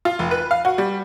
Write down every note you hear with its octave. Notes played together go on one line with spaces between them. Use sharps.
F4
F1
B4
F5
F#4
G3